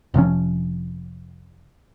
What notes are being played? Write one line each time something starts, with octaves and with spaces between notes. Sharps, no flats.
F1 C3 F3 C#4